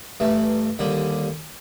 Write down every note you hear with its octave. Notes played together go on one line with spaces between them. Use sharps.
G2 E3 A3
D#2 D3 G3